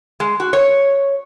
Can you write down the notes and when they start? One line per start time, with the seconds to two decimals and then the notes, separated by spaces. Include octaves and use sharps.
0.20 G#3
0.40 F#4
0.53 C#5